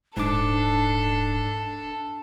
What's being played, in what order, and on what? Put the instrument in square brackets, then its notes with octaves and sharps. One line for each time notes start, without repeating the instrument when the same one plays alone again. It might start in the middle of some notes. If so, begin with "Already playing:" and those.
[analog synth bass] D#1 [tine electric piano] G#2 A5 D6 [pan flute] D4 [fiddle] A4